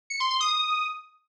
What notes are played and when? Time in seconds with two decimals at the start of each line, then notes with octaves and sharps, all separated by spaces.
0.10 C#7
0.20 C6
0.30 C6
0.40 D#6